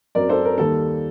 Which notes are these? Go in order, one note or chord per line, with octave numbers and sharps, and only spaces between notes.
F#2 F#3 C4 A#4 D5
A4 C5
A#4
D#2 D#3 G3 A#3 A4